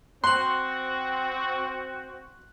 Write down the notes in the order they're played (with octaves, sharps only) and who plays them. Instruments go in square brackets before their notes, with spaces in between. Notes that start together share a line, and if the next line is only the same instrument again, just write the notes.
[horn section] C4 F#4 [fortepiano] C6 [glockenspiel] F#6 F#7